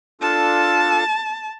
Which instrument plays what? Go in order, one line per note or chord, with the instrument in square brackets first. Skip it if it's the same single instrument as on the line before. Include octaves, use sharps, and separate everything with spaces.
[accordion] D4 F4 A4 [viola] A5